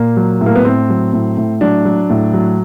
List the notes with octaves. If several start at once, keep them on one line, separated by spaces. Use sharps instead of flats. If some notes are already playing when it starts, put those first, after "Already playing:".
Already playing: A#2 A#3
F#3
A2
A#3
B3
A2 C4
F#3
A2
A2
F#3 D4
F#3
A2
F#3